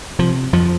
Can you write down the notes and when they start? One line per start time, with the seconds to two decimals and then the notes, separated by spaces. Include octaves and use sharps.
0.19 C3 F3
0.53 F2 F3